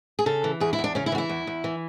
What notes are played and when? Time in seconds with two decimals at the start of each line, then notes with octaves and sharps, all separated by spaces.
0.19 G#4
0.26 C#3 A4
0.44 E3
0.60 E2 G#4
0.73 E4
0.79 E2
0.84 D4
0.95 C#3 C#4
1.06 E4
1.12 E3 F#4
1.18 E4
1.29 E2
1.47 E2
1.64 E3